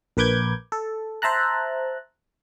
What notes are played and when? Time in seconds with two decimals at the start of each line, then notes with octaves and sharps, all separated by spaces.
0.17 A#1 A#4 B4 D6 G6 G#6
0.72 A4
1.22 C5 E5 A5 A#5 F#6